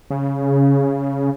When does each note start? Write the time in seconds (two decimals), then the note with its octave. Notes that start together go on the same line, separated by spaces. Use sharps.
0.10 C#3